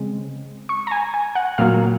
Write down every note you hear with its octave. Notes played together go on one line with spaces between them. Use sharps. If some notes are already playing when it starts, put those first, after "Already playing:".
Already playing: C#3 G#3 C4
C#6
A#5
G#5
G#5
F#5
A#2 F#3 A#3 F5